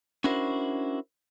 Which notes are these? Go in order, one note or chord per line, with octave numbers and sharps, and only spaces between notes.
C#4 D4 E4 F#4 A#4 C5